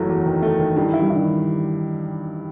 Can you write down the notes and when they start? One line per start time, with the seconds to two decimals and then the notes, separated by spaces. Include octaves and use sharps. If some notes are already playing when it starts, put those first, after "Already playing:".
Already playing: F#1 E3 F#3 A3
0.09 E2
0.26 D#3
0.42 A3
0.59 D#3
0.76 G2 E3
0.93 E4
1.02 G3
1.10 E4
1.15 D#3